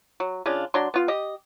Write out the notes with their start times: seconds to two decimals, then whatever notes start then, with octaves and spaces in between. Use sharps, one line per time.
0.20 F#3
0.46 C#3 D4 F4
0.74 F#3 D4 C6
0.94 B3 F4
1.08 G4 D#5